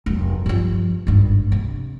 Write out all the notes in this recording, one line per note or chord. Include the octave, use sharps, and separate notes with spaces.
F1 F#2
G2 F3
G#1 G2
C3